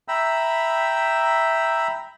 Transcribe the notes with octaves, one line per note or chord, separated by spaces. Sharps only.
E5 G5 A#5 B5 E6